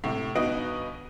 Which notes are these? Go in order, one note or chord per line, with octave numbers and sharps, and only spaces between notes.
A2 C3
G1 B3 D#4 F#4 D#5 D7